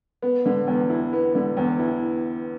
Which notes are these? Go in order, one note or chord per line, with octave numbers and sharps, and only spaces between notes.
B3
D3
E2
E4
B3
D3
E2
E4